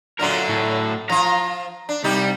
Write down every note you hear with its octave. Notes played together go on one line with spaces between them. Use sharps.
F#2 D3 F#3 F4 A#4
A2
F3 F4 A#5
D4
C2 G3 D#4 G4